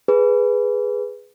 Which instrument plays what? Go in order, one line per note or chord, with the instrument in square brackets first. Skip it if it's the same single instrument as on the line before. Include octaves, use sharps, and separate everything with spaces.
[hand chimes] G#4 B4